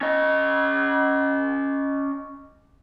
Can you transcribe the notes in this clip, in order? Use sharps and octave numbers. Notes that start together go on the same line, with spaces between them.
C#4 D#5